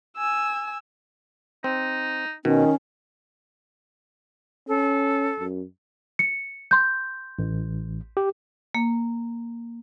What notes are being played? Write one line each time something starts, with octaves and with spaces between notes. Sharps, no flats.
G#5 E6
C4 D#4
B2 D#3 C#4
C#4 A4
F#2
C#7
C6 G6
A1
G4
A#3